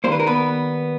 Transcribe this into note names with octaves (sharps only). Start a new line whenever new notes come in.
D#3 G3 A#3 C5
B4
A#4
B3 B4